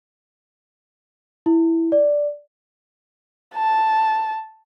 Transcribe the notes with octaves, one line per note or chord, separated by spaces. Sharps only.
E4
D5
A5